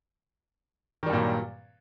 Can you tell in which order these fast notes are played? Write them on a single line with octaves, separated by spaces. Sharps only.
D#3 G3 G2 A#2 F#3